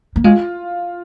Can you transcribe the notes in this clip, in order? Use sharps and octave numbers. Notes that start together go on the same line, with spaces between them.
A#3
G#3 F4